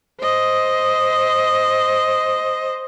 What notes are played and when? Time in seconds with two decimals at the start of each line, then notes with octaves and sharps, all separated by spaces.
0.21 C5 D#5